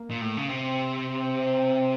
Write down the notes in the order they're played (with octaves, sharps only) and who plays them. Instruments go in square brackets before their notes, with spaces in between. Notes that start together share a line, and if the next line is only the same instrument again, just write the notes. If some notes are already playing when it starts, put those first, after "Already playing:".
Already playing: [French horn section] A#3
[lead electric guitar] A#2
A2
C#3
[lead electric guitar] C3 [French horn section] C4